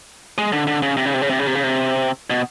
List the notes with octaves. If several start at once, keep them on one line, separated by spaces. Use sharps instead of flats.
G#3
D3
D3
C#3
C3
C#3
C3
C#3
C3
C#3
C3
C#3
C3
B2